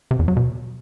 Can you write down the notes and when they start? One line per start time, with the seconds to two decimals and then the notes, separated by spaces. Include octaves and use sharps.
0.11 C3
0.19 E2
0.28 F#3
0.37 B2